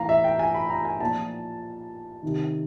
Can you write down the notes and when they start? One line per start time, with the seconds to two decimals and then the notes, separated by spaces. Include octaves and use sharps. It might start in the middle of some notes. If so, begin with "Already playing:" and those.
Already playing: A2 E3 F5 A#5
0.09 E5
0.24 G5
0.39 G#5
0.54 B5
0.70 A#5
0.85 G#5
1.00 A#2 F3 A5
2.23 C3 D#3